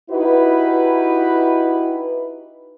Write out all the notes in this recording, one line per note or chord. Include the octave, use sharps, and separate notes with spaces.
D#4 E4 F#4 G4 B4